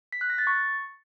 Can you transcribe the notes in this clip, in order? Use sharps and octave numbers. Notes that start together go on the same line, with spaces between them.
B6
F#6
A#6
A6
C#6